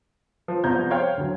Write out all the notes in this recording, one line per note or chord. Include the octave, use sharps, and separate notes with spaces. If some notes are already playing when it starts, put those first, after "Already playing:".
F3
C2 F3 B3 A#5 G6 G#6
C5 C#5 F5 G5 F6 G#6
D2 F#3